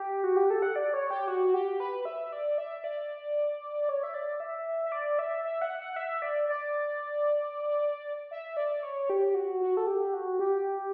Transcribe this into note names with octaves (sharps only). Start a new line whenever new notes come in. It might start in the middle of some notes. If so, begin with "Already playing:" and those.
Already playing: G4
F#4
G4
A4
F#5
D5
C#5
G4
F#4
G4
B4
E5
D5
E5
D5
C#5
E5
D5
E5
E5
D5
E5
E5
F#5
F#5
F#5
E5
D5
D5
E5
D5
C#5
G4
F#4
F#4
A4
G4
F#4
G4